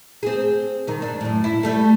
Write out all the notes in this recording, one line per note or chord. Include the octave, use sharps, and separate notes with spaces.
C4 G#4
G2 D#3
D4
F#2 A2
E4
G3 A3 A4